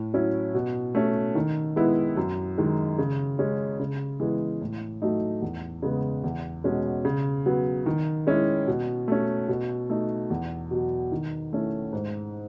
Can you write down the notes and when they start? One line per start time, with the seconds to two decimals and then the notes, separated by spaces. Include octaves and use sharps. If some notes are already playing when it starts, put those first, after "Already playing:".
Already playing: A2
0.14 F#3 C#4 E4
0.54 B2
0.95 A3 C#4
1.35 D#3
1.76 G#3 B3 E4
2.17 F#2
2.58 D#3 G#3
2.98 C#3
3.39 G#3 C#4
3.79 C#3
4.20 E3 G#3 B3
4.61 A2
5.02 F#3 A3 D#4
5.42 E2
5.82 C#3 G#3 B3
6.24 E2
6.64 B2 G#3 C#4
7.05 C#3
7.46 F#3 B3
7.86 D#3
8.27 G#3 C#4 E4
8.67 B2
9.08 A3 C#4
9.48 B2
9.89 A3 D#4
10.30 E2
10.71 B2 F#3
11.12 D#3
11.53 A3 C#4 E4
11.93 G#2